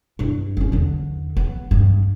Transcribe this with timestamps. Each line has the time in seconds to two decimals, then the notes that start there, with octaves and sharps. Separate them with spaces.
0.19 G2 E4
0.57 D2 C#4
0.72 E2 D3
1.37 B3
1.71 G2 G#3